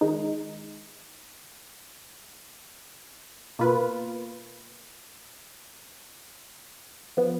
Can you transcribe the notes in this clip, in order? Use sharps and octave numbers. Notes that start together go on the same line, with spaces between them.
D#3 G#3 D#4
B2 A#3 F4 B4
F3 B3